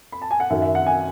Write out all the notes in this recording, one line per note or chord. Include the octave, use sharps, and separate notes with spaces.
B5
A5
G#5
F#5
F#2 D#3 F#3 E5
E5
F#5
G#5